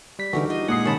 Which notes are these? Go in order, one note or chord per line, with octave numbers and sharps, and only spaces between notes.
G3 B6
D3 E3 G3 D4 D#4 F#4 G4 A#4
F4 D#5
A#2 G#3 F#5 D#6 C7
C3 D#3 C#4 G#4 A5 B5